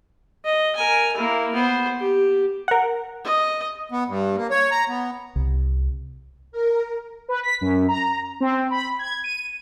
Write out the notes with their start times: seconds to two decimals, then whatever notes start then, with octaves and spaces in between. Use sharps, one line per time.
0.45 D#5
0.76 A#4 G#5
1.16 A#3 E4
1.53 B3 C5
1.99 G4
2.68 A#4 F#5
3.24 D#5
3.92 B3
4.07 G2
4.37 A#3
4.51 C#5
4.71 A#5
4.88 B3
5.36 C2
6.52 A#4
7.29 B4
7.43 B6
7.61 F#2
7.88 A#5
8.40 C4
8.71 B5
8.99 G#6
9.24 D#7